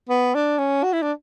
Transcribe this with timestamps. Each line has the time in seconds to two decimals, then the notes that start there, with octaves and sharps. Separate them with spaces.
0.09 B3
0.35 D4
0.58 C#4
0.83 F#4
0.93 E4
1.02 D4